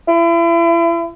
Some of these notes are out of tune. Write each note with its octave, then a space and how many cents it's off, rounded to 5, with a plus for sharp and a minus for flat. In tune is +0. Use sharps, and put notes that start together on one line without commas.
E4 +35